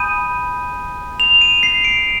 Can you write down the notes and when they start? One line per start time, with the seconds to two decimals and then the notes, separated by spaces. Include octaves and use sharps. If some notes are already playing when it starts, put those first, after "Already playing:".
Already playing: G#5 B5 D#6 G6 D#7
1.20 F7
1.41 D#7
1.63 C7
1.85 D7